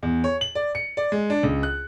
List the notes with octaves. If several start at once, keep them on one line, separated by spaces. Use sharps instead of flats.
E2
C#5
F#7
D5
C#7
D5
G#3
D4
C#2
F#6